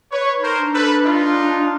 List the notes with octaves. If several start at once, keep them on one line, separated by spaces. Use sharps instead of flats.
B4 C#5
D#4
A#4 C5
D4
A4 B4
D4
D#4 F4